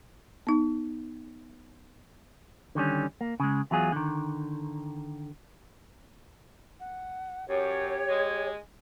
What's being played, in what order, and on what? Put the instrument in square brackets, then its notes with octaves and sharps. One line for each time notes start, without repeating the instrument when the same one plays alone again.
[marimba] B3 D#4
[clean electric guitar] D3 D#3 G3 C#4
A#3
C#3 G#3
E2 F#3 F4 G#4
D3 D#3
[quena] F#5
[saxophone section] F#2 [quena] G4 [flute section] C#5
[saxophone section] G#3